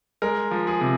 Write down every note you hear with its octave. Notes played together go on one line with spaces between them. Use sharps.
G#3 A#4
F3
G#4
C3